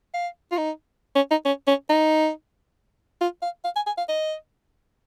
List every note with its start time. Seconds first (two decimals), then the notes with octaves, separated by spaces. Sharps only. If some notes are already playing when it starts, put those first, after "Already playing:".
0.14 F5
0.52 F4
0.57 D#4
1.16 C#4
1.31 D#4
1.45 C#4
1.67 C#4
1.90 D#4
3.21 F4
3.42 F5
3.65 F5
3.76 G#5
3.87 G#5
3.98 F5
4.08 D#5